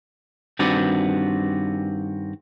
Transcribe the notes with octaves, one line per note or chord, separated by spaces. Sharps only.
G2 D#3 C4 F#4 B4 D5